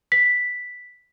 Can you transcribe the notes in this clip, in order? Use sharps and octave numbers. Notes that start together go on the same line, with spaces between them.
B6